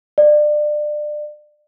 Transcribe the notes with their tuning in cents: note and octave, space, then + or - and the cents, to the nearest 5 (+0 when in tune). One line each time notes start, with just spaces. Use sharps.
D5 +25